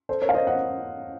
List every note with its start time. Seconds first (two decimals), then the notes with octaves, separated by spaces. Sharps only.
0.09 A4 C5
0.22 A#4 C#5
0.29 F5
0.34 C5 D#5
0.47 D#5 F#5